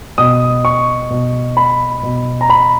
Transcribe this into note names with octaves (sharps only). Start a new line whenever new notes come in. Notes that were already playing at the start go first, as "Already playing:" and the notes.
B2 D#6
C#6
B2
B5
B2
A#5
B5